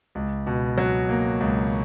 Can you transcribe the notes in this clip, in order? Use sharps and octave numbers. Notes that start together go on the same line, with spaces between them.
C#2
B2
F#3
A#3
C#2